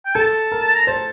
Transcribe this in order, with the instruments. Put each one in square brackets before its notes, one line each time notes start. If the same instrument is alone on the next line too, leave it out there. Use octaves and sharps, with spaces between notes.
[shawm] G5
[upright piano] A4 [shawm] A5
[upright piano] A#4
[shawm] A#5
[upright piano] C5 [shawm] A5